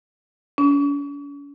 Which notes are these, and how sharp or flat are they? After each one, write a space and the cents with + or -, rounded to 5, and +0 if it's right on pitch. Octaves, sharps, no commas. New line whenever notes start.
C#4 +45